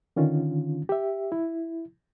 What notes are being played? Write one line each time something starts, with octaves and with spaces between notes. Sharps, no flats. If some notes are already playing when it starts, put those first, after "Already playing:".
D3 D#3 C#4 F4
G4 E5
E4